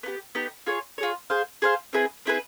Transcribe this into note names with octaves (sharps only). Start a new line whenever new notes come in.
B3 D#4 G4
B3 D#4 G4
F4 G#4 C#5
F4 G#4 C#5
G#4 C5 F5
G#4 C5 F5
C4 E4 G#4 B4
C4 E4 G#4 B4